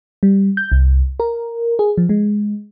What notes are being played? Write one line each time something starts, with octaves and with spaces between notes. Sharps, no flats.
G3
G6
C2
A#4
G#4
F3
G#3